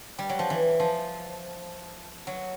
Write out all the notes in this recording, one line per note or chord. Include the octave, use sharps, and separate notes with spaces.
G3
F#3
F3
E3
F3
F#3